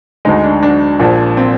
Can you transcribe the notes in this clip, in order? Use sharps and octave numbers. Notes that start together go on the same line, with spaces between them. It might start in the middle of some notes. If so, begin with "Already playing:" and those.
D2 D3 G#3 D#4
D4
D4
A#1 A#2 F3
C4